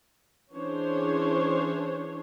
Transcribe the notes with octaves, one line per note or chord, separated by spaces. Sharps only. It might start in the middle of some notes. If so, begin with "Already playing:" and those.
E3 C#4 D4 G#4 C5 C#5